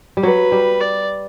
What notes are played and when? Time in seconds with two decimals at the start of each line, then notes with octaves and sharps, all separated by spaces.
0.17 G3
0.23 F#3 B4
0.52 G3
0.81 D5